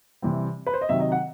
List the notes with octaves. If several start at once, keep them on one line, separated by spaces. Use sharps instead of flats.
C3 E3 G3 C4
B4
C5
D#5
C3 D#3 F#3 E5
D#5
F#5